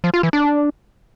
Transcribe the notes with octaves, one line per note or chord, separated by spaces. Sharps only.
F3
F4
E3
D4